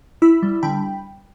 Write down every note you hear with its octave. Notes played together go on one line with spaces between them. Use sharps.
E4 B5 E6
G3
D3 G5 B5